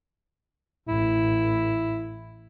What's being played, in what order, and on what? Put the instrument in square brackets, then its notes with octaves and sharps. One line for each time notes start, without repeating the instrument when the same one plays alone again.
[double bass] A1 [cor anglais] E4